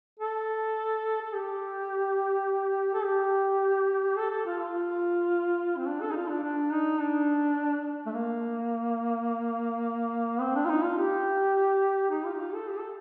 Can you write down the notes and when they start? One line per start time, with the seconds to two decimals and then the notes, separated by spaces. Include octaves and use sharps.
0.20 A4
1.21 A4
1.33 G4
2.94 A4
3.03 G4
4.17 A4
4.31 A4
4.46 F4
4.59 F4
5.78 C4
5.87 D4
6.01 A4
6.11 D#4
6.16 F4
6.29 D4
6.43 D4
6.72 D#4
7.01 D4
8.06 A3
8.14 A#3
10.41 C4
10.55 D4
10.65 F4
10.69 D#4
10.83 F4
10.97 G4
12.11 D#4
12.25 F4
12.34 G4
12.39 F4
12.54 A4
12.68 G4
12.78 A4